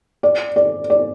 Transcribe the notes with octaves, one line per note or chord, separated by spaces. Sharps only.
D5
D5
D5